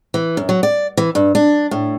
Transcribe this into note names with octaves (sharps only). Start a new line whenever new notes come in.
E3
F#2
F#3
D5
E3
G2
D4
A2